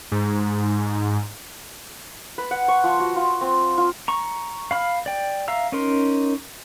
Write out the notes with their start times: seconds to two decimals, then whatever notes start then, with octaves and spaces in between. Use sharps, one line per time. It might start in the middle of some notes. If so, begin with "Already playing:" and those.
0.12 G#2
2.38 B4
2.51 F#5
2.68 C#6
2.84 F3
3.00 F#4
3.16 F4
3.41 C4
3.78 F4
4.08 A#5 C#6
4.71 F5 B5 F6
5.06 D5 G5
5.48 E5 F5 A#5 E6
5.72 C#4 D#4 A#4 C6